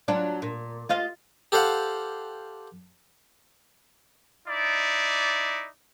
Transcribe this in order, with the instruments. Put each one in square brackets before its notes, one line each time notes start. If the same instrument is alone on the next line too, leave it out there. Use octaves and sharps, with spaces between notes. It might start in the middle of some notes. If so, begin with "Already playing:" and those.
[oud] F#3 D4 F4
A#2
F4 D#5 F5
[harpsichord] G4 A4 C5 F5 F#5
[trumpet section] D#4 E4 D5